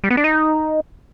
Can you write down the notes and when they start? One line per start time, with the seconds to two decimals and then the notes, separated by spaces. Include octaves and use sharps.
0.04 G3
0.10 B3
0.17 D4
0.24 D#4